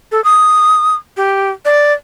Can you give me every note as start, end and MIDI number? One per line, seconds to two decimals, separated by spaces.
0.12 0.23 69
0.24 0.95 87
1.17 1.50 67
1.65 1.93 74